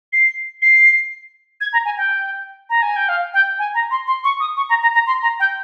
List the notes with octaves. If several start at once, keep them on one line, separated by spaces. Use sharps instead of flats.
C7
C7
G#6
A#5
G#5
G5
A#5
G#5
G5
F5
G5
G#5
A#5
C6
C6
C#6
D#6
C#6
A#5
A#5
A#5
C6
A#5
G5